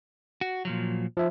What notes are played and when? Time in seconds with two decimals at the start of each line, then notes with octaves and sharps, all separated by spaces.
0.41 F#4
0.65 A#2 F3 F#3
1.17 F3 E5